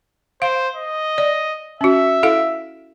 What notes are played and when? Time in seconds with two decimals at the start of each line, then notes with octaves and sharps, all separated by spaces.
0.42 C5 F5
0.76 D#5
1.18 D5
1.81 C#4 F#4 E5
2.23 E4 A4 F5